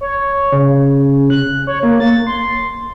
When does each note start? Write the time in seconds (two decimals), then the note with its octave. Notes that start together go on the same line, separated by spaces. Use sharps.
0.01 C#5
0.52 C#3
1.30 F#6
1.67 C#5
1.83 A#3
2.00 A6
2.27 C6